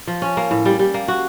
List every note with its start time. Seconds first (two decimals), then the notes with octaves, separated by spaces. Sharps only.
0.07 F3
0.22 C#4
0.37 A#3
0.51 A2
0.65 G3
0.79 G3
0.94 A#3
1.08 F#4